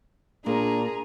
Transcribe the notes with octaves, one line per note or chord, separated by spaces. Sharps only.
A#2 A#3 D4 G#4 A#5